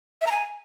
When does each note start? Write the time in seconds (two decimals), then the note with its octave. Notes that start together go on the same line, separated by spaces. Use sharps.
0.21 E5
0.26 A#5
0.31 G#5